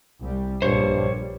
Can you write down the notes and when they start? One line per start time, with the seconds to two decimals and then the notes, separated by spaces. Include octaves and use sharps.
0.21 C2 G3
0.62 A#1 G2 A#2 G3 C5 C#5